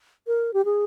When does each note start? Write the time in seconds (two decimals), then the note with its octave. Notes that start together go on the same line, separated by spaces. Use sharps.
0.27 A#4
0.54 G4
0.65 G#4